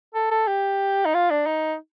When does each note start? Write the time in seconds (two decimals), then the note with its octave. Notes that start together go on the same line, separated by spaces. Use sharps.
0.14 A4
0.31 A4
0.47 G4
1.05 D#4
1.14 F4
1.30 D4
1.46 D#4